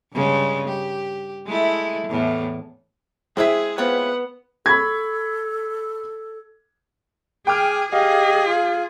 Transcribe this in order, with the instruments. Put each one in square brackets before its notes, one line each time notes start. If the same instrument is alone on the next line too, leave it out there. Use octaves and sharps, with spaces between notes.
[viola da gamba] G2 C#3 G#3
G4
G#3 A3 E4
E2 A2
[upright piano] G#3 E4 [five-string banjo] C4 E5 [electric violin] G#4
[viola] B3 [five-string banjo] C4 F4 C#5 [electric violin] F#5
[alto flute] A4 [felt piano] B5 C#6 G#6
[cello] G#4 [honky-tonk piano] G5 D6 F6
[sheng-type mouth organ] G4 D#5 [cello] G#4 [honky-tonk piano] F5
[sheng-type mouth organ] F4